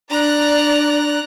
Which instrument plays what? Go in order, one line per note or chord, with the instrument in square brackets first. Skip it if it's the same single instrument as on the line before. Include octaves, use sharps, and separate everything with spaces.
[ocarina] D4 [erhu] D5 [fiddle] A#5 F#6